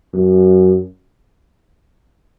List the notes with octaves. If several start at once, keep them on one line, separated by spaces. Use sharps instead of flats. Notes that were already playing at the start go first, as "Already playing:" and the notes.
F#2